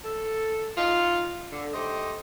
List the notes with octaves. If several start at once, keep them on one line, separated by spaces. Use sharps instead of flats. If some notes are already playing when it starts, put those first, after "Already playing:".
A4
D#4 F4
D3
A3 D#4 G4 C5 D#5